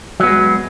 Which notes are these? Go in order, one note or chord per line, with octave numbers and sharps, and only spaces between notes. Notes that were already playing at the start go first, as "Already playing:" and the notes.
F#3 G#3 B3